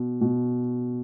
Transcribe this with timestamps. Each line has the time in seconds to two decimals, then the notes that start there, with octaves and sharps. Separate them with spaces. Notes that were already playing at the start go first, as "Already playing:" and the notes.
Already playing: B2
0.21 B2